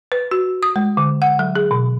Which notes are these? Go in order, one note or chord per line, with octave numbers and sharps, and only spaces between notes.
B4
F#4
D#6
G#3
D3
F#5
F#3
G#4
B2